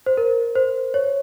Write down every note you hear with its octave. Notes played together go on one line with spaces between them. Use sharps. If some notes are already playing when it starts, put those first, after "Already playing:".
C5
A#4
C5
C#5